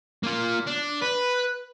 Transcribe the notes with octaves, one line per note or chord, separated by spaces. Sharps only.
A#3 F4
D4
B4